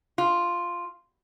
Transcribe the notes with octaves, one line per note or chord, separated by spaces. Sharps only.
F4